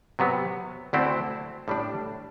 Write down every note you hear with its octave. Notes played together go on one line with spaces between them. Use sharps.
C3 F#3 B3
D2 D3 A3 C4 E4
A2 G3 D4